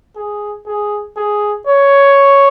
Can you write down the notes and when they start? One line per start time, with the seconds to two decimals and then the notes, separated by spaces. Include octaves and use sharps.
0.17 G#4
0.67 G#4
1.17 G#4
1.67 C#5